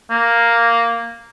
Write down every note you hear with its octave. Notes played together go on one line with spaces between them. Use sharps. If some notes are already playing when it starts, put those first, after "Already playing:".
A#3